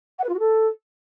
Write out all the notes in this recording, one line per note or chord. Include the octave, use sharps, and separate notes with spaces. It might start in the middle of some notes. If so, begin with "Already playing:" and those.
F#5
B4
F4
F#4
A4